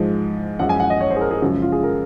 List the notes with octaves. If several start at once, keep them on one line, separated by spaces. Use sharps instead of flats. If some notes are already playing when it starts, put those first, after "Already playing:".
Already playing: G#2 F3 G#3
F#2 F3 G#3 F#5
G#5
F#5
D#5
C#5
C5
G#4
A#4
G#4
F#2 C#3 F3 G#3 F#4
F4
G#4
A#4